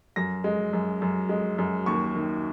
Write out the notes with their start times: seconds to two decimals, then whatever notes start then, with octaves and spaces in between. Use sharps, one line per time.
0.16 F#2 A#6
0.44 G#3
0.73 F#2
1.02 F#2
1.29 G#3
1.58 F#2
1.86 D#2 C#6
2.15 D#3